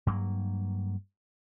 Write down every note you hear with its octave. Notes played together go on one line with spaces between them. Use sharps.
G2 F#3 A#3